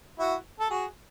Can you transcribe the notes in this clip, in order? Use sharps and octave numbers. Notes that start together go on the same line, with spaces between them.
E4 F#4
A4
F#4 G#4